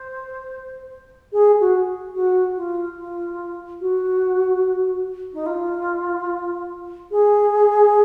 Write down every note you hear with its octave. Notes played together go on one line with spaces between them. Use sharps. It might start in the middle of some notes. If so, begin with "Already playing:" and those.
Already playing: C5
G#4
F#4
F#4
F4
F4
F#4
D#4
F4
G#4